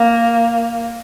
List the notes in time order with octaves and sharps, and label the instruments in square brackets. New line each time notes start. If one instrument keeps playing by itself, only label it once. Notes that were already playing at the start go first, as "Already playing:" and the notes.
Already playing: [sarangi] A#3